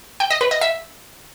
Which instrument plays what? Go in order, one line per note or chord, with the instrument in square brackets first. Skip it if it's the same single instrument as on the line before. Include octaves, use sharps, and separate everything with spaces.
[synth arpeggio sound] G5
D#5
B4
D#5
E5